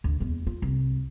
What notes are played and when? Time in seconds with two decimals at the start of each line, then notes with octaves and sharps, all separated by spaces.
0.04 D2
0.20 E2 A#3
0.47 F4
0.62 C2